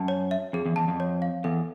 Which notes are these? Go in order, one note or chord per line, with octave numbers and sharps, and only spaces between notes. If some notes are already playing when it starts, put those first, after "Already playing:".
Already playing: F#2 A5
C#5
E5
F2 G#4
E2
E2 A5
F2
C#5
F5
E2 A4